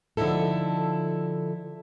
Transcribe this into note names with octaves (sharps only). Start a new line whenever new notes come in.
D3 F3 D#4 E4 A4